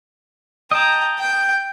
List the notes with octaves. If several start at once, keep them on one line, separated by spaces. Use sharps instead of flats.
D#5 G5 A5 A#5
G5